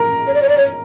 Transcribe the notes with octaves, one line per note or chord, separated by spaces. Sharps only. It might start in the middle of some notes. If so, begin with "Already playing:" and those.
Already playing: A#4
C#5
D5
C#5
D5
C#5